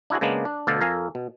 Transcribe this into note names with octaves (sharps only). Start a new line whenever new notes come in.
D4 E4 F#4 G#4
C#3 G#3 A#3 B3 D4
D4
D2 B2 A4 D5 F5
F2 A4 A#4 F5 G#5
B2